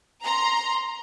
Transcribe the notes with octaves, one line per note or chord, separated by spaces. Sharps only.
A#5 C6